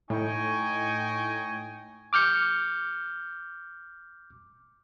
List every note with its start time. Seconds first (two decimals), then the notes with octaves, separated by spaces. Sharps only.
0.10 A2 D#4 D#5 G5 G#5 C#6
2.13 D6 F6 G6 C#7